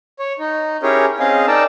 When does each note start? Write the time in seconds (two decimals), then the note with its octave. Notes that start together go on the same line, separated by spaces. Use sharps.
0.19 C#5
0.39 D#4
0.83 C#4 E4 G4 G#4 A#4 C#5
1.19 C4 C#4 G#4 D#5 F5
1.47 D#4 A#4 D5 G5 A5 E6